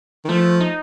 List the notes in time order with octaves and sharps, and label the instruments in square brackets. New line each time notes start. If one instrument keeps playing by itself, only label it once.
[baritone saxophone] D#3
[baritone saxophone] F3 [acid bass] A3
[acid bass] D#4